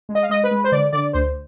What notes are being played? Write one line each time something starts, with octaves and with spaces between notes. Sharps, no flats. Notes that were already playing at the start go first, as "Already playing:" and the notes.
G#3
D#5
F5
G#3 D#5
B4
G#3
C5
D3 D5
D3 D5
D2 C5